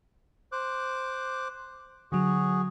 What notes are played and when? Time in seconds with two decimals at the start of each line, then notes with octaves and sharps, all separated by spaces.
0.52 C5 D6 F#6
2.12 D3 F#3 F#4 G#4